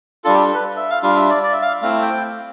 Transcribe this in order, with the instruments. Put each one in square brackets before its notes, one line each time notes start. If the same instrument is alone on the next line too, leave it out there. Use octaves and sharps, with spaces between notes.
[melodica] G3 D4 F4 A4
G4
A4
B4
E5
F5
G3 D4 F4 F5
E5
D5
D5
E5
F5
A3 C4 E4 F5
G5